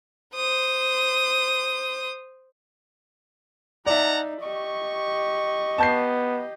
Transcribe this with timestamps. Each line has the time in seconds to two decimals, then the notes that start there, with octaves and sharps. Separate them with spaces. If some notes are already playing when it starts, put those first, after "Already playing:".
0.35 C5 D#6
3.86 D#4 D5 E5 F#5 A5 A#5
4.42 G4 D#5 C#6
5.78 B3 A5 G6 C7